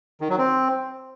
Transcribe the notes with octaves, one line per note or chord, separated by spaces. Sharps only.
D#3
F#3
C4